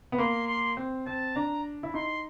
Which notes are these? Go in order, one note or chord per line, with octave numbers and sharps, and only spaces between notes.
B3
A#3 C6
C6
C4
C4 A5
D4 A#5
E4
D#4 C6